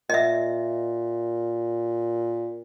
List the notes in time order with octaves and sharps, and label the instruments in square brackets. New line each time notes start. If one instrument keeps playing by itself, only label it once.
[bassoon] A#2 [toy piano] D#5 E5